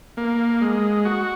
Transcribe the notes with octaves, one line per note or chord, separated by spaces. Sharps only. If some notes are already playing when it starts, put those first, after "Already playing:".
A#3
G#3
F#4